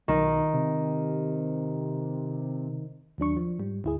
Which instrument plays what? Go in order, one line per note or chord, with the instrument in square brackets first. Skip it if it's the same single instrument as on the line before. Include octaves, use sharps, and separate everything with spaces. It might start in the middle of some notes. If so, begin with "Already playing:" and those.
[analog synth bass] B1 [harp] D#3
[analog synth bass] C3
[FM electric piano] D#2 F#3 D4 C#6
F3
G#2 G3
D2 E4 G#4